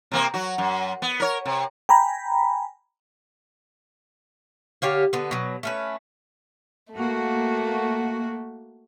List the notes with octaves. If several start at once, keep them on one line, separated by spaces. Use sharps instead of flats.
C3 A#3 C4
F#3 F#4
F#2
B3
A#4 C#5
C3
G5 G#5 A#5 B5
D3 G4 C#5 F5
D3 B3
B2 F#3
A3 C#4 B4
A3 A#3 F#4